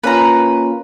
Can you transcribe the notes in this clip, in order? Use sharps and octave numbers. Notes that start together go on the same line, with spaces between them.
A#3 C#4 F4 B4 A#5